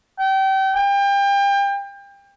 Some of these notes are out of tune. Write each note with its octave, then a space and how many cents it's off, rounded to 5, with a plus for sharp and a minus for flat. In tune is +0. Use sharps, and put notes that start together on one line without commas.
G5 -30
G5 +30